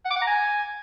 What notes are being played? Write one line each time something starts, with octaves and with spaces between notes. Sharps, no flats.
F#5
D6
F#5
A#5
G#5